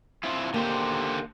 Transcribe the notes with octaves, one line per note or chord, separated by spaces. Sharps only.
C4 E4 F4
D#2 D3 A#3 G4 C5